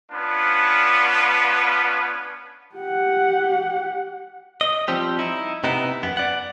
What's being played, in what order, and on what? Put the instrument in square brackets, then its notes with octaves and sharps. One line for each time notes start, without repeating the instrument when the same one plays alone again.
[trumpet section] B3 C#4 D4 F4 B4
[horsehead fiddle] G4 F#5
[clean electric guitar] D#5
F3 G3 C4 G4
D#4 E4
C3 B3 D#4 E4
F#2 B3
D5 F#5